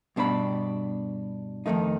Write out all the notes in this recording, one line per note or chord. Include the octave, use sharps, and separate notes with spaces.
G2 B2 D4 B4 B5
F2 G#2 D#3 A3 D#4